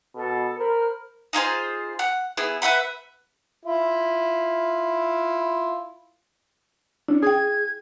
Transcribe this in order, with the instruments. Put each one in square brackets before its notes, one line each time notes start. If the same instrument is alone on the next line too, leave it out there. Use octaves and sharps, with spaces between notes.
[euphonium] B2 [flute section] A4
[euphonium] A#4 [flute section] C5 B5 F6
[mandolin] D#4 F4 G#4 C5
F#5
B3 E4 G#4
B4 E5 F#5 B5
[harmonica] E4 F4
[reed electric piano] C#4 D4 [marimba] E4
[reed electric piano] G#4 [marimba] G5 D#6 [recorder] G#6